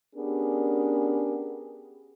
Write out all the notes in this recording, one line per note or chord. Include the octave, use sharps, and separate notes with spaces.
B3 C#4 D4 G4 G#4 A#4